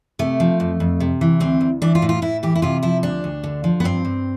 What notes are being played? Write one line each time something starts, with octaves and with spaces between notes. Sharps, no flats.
C3 A3
F3
F2
F2
C3
E3
D2 C4
D2
E3 D4
F4
A2
F4
A2 E4
E3 G4
E4
C3 F4
F3 E4
D2 D4
D2
D3
F3
B3
G2 C4
G2